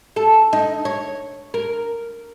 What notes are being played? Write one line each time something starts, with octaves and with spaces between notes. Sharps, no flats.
A4
D#4
C#5
A#4